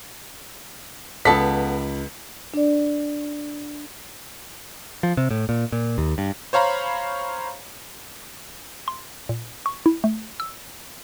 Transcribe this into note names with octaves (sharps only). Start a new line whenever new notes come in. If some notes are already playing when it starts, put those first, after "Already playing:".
C#2 B3 A4 B6
D4 D5
F3
C3
A2
A#2
A#2
D#2
G2
C5 C#5 F5 A#5 B5
C6
A#2
C#6
E4
A3
E6